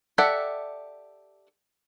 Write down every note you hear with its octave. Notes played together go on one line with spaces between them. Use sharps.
G4 A4 D5 E5 F#5